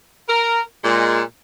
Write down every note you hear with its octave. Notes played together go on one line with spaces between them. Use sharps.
A#4
A#2 G#3